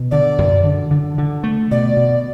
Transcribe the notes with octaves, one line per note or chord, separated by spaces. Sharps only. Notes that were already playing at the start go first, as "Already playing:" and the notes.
Already playing: B2
D3 D5
F#2
D3
D3
D3
A3
B2 D5
B2